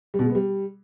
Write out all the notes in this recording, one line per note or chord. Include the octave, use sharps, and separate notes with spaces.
G3
B2
G#3
B3
G3